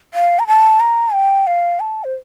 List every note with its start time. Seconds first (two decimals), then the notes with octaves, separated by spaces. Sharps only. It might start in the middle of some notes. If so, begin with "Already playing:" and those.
0.14 F5
0.39 A#5
0.47 A5
0.80 A#5
1.14 G5
1.47 F5
1.80 A5
2.04 C5